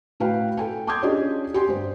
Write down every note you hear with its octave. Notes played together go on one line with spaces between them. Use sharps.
A2 F#4 B4 F5 G5
A4 G5 G#5
A5 C6 D6 D#6 G6 G#6
C#4 D4 F4 G4 G#4 D#5
G4 G#5 C6
G2 C5